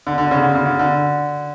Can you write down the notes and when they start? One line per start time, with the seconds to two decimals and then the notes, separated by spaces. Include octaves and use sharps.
0.07 D3
0.18 D3
0.31 C#3
0.43 D3
0.55 C#3
0.66 D3
0.79 D3